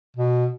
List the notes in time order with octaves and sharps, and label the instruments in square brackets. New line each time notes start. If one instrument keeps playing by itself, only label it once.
[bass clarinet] B2